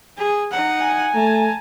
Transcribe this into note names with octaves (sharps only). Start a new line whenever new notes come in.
G#4
D#4 F#5
G#5
A3 A5 A#5